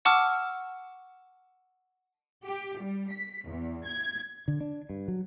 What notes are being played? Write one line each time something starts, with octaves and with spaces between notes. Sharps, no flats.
F#5 A5 C#6 D6 E6 F6
G4
G3
B6
E2
G#6
D3
D4
G2
F#3